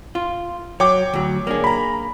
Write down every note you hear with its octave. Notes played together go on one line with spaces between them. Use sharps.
F4
F#3 C#5 G5 D6
D2 F#3
A#3 D4 G#4
A#5 B5